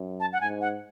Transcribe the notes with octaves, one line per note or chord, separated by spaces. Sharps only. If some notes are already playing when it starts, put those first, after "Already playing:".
Already playing: F#2
A5
F#5
G#2 G#5
F#5